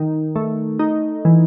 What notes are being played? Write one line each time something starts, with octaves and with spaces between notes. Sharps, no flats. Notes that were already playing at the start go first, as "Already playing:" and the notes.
Already playing: D#3
A3
D#4
E3